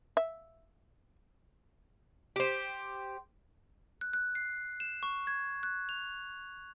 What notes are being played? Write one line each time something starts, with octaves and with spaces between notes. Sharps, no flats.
E5
G4 C5
F#6
F#6
C7
E7
C#6
G#6
F#6
F7